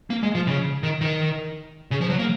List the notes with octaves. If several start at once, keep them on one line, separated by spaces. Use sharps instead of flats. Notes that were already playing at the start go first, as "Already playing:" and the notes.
A#3
G#3
F3
C#3
D#3
D#3
C#3
F3
F#3
A#3